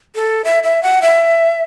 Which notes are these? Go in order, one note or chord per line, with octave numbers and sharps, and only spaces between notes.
A4
E5
E5
F#5
E5